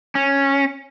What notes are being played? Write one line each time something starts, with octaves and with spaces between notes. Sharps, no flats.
C#4